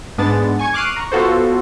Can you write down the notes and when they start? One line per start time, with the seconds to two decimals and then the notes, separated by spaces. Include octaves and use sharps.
0.18 G#2 G#3 B3 D4 A5 A6
0.59 G#5 C#6 G#6
0.73 C#6 D6 F6 F#6 C7 D#7
0.96 A#5 C#6
1.12 B3 F4 F#4 A4 C5